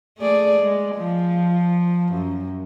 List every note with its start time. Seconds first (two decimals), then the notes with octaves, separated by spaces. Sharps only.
0.18 A3 G#4 D5
0.60 G#3
0.95 F3
2.13 F#2